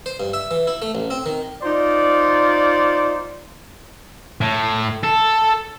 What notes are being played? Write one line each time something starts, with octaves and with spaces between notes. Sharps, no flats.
C5
G2
E5
E3
E4
A3
A1
C4
D#3
D#4 F4 C5 D5
A2
A4